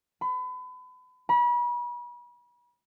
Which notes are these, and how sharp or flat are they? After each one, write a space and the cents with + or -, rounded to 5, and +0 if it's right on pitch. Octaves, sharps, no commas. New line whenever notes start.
B5 +35
B5 -35